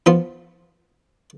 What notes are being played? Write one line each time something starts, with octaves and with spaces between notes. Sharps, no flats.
F3 B3 F4